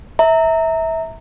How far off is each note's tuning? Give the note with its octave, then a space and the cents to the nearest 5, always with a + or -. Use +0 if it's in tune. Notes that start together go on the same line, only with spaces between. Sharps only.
E5 -20 A#5 -20